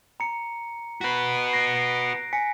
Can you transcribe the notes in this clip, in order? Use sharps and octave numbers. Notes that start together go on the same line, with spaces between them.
A#5 C#7
F#4 B4 F#6 B6
A#6 C7 D7
G#5 B6 C#7